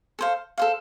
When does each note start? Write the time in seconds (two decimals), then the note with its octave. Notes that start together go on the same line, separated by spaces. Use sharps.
0.19 A4 C5 F5
0.58 A4 C5 F5